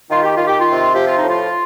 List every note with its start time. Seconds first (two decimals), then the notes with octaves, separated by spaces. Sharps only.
0.10 D#3 F4
0.23 G4
0.35 D#3 F4
0.47 G4
0.59 F4
0.68 C3
0.95 F3 G4
1.07 F4
1.18 D#4
1.24 A2
1.30 F4